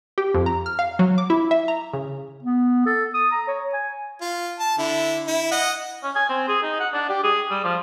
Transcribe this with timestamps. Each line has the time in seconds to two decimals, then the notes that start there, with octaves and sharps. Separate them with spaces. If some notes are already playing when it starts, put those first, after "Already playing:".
0.18 G4
0.34 F2
0.46 A#5
0.66 F6
0.79 F5
0.99 F#3
1.18 D6
1.30 E4
1.51 E5
1.68 A#5
1.94 C#3
2.43 B3
2.87 A4
3.14 D#6
3.32 A#5
3.48 C#5
3.73 G#5
4.21 F4
4.60 A5
4.78 D3 E4
5.27 E4
5.52 D#5 F#5
6.03 C#4
6.15 G#5
6.29 C4
6.48 G#4
6.63 D#4
6.80 F#5
6.93 D4
7.09 G4
7.23 G#4
7.50 G3
7.64 F3